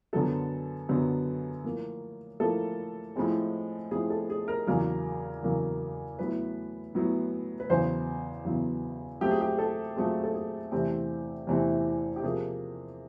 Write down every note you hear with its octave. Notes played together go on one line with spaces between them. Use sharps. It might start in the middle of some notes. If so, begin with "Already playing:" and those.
F#2 D3 F#3 B3 A4
F#2 D3 F#3 B3
A2 F3 A#3
A2 F3 A#3 A4
A2 F3 G#3 C4
A2 F3 G#3 C4 G#4
A4
G#4
A#4
E2 C#3 F#3 A#3 A#4
E2 C#3 F#3 A#3
A2 F#3 B3 B4
A2 F#3 B3
B4
E2 C#3 F#3 B3 C5
E2 C#3 F#3 B3
A#2 F#3 A3 C4 G4
G#4
G4
A4
A#2 F#3 A3 C4 G#4
A4
G#4
E2 C3 E3 A3 C4 G4
E2 C3 E3 A3 C4
G4
C3 F3 A#3 G#4